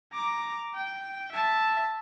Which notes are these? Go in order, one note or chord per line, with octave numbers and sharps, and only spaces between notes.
A#5 D6
G5
E5 A5